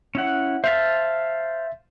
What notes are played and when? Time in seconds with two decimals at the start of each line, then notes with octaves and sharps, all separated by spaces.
0.15 C#4 E4 F#5
0.64 C5 E5 F5 A5 B6